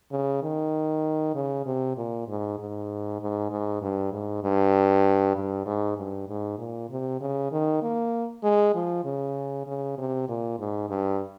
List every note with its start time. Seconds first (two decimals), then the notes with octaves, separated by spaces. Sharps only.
0.11 C#3
0.43 D#3
1.35 C#3
1.66 C3
1.97 A#2
2.28 G#2
2.58 G#2
3.21 G#2
3.50 G#2
3.81 G2
4.12 G#2
4.44 G2
5.36 G2
5.66 G#2
5.97 G2
6.28 G#2
6.58 A#2
6.90 C3
7.21 C#3
7.52 D#3
7.82 A#3
8.43 G#3
8.75 F3
9.05 C#3
9.67 C#3
9.98 C3
10.29 A#2
10.59 G#2
10.89 G2